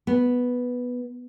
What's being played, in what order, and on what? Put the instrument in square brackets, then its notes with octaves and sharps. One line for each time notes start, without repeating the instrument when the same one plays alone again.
[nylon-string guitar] B3